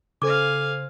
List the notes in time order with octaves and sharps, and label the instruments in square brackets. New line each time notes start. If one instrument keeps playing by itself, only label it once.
[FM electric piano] C#3 C5 [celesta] A4 D6 [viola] F5 G#5